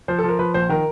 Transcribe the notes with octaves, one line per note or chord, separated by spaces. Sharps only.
F3 C5
A4
F3
A#4
F3 B4
A#1 C5
D#3 A#4